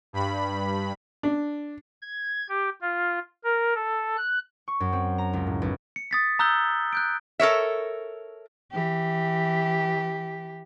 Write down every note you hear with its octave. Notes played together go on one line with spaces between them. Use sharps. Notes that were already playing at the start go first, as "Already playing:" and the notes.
G2 B5
D4
G#6
G4
F4
A#4
A4
F#6
C#6
F#2
C4
A#5
C#2
A2
B1
C#7
D#6 A6 B6
A#5 D#6 E6 F#6 G6 G7
F#6 G6 D7
A4 A#4 C#5 E5
E3 G4